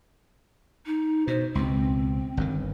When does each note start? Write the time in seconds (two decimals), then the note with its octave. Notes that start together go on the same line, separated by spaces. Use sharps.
0.86 D#4
1.27 B2 C5
1.55 C#2 B2 C4
2.37 G1 G2 D#3